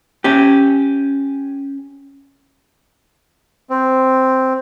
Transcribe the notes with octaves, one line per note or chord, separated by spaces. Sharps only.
C#4 G4
C4